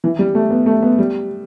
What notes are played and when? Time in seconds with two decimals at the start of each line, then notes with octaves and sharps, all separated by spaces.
0.04 E3
0.19 G3
0.35 A3
0.50 B3
0.66 A3
0.82 B3
0.99 G3